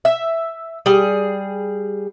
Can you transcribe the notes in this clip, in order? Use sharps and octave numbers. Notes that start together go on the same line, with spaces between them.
E5
G3 G#4